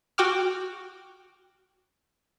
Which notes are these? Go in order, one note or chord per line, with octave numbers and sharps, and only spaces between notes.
F#4 G5 D6 F6